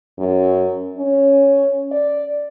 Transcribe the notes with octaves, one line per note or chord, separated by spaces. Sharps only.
F#2
C#4
D5